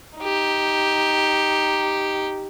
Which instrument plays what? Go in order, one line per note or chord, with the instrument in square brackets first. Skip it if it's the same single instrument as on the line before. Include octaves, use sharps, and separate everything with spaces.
[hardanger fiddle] D#4 G4